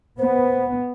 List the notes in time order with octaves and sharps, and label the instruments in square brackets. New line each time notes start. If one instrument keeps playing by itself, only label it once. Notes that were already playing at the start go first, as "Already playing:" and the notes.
[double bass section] B3 [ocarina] C5